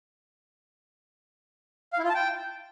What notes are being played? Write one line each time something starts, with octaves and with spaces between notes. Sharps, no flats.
F5
E4
F4
A5
G5